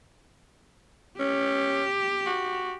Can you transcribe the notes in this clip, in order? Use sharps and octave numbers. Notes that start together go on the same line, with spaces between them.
C#4 G4
F#4